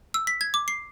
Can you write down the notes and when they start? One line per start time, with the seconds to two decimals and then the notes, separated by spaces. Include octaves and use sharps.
0.14 E6
0.27 B6
0.41 G#6
0.54 D6
0.68 C7